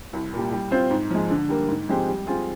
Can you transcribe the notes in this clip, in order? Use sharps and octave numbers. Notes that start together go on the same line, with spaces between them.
C2
A#2 G3
G3
C4 F4 C5
G#2
F3 G#3
D3
G3 A#3
G#2
F3 G#3 C4 G4
G3
C4 F4 G#4